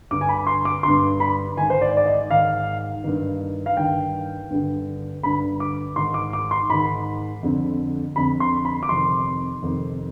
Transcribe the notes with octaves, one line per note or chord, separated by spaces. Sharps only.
G2 D3 D6
G#5
B5
C6
D6
G2 D3 C6
B5
G#2 D#3 G#5
C5
D5
D5
D#5
G#2 D#3 F5
G2 D#3
F5
G2 D#3 G5
G2 D3
G2 D3 B5
D6
G#2 D#3 C6
D6
D6
C6
G#2 D#3 B5
F2 D3
F2 D3 B5
C6
B5
D6
F2 C3 D#3 C6
F2 C3 D#3